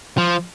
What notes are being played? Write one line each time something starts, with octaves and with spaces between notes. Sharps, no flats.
F3